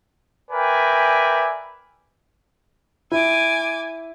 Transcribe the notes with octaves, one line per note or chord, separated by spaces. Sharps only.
A#4 B4 D5 E5 G5 G#5
E4 G#5 D6